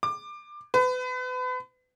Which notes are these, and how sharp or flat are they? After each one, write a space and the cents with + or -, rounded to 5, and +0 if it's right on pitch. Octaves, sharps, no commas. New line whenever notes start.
D6 +20
B4 +35